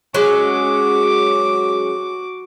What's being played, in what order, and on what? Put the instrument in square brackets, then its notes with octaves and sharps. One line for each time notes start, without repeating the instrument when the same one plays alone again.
[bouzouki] F#3 G#3 C#4 [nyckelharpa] F#4 D6